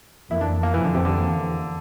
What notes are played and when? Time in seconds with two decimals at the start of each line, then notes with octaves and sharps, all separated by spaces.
0.30 F2 E3 A#3 E4
0.41 D4
0.63 A#3
0.74 F2 C3 E3 F3
0.84 D3
0.95 C3
1.05 D3
1.16 E2 E3 A#3